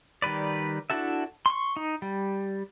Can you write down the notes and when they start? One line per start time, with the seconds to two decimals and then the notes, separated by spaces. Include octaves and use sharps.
0.22 D#3 G3 B4 D5
0.90 D4 E4 F#4 A4 E5
1.46 C6 C#6
1.77 D#4
2.02 G3